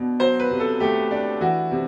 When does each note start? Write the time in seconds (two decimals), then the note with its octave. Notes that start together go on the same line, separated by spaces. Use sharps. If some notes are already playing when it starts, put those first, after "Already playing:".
Already playing: B2 D4
0.19 F#3 C5
0.40 B4
0.51 C3
0.60 A4
0.80 A3 G4
1.11 D4
1.41 E3 F#4
1.71 C3